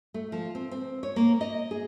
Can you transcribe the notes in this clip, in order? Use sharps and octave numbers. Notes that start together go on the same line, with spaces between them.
A3
F3
C4
C4
C#5
A#3
D#5
G#4